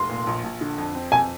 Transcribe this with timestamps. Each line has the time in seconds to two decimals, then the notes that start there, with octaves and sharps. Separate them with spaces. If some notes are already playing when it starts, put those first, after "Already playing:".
Already playing: F1 C6
0.09 A#2
0.27 A#1
0.44 A#1
0.61 D3
0.78 F2
0.95 C4
1.12 F2 G#5